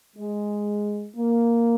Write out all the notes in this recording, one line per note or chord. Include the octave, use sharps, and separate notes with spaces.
G#3
A#3